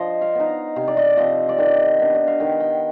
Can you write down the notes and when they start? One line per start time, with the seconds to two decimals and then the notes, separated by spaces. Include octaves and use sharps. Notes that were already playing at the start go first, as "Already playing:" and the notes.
Already playing: F3 C5 D#5
0.21 F5
0.35 B3 D#4
0.76 C3 F5
0.88 D5
0.97 D#5
1.17 F3 C4 D#5
1.49 D5
1.58 D#3 D#5
1.99 B3 D4
2.15 D#5
2.27 F5
2.40 D#3 G5
2.60 G5